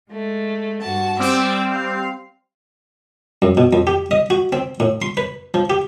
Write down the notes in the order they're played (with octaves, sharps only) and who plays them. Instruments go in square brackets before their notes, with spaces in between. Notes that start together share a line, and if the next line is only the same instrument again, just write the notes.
[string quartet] G#3 A3
G2 F#4 A5
[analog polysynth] G3 C4 [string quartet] G5 D6 E6
[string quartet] F5
[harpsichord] F#2
B2
F2
G4
D#5
F#4
C4
A2
C6
B4
F3
G4